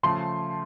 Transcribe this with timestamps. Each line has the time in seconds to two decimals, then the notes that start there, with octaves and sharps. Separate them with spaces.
0.03 C#3 F3 A3 C6